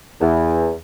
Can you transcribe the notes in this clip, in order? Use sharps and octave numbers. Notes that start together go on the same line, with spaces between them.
E2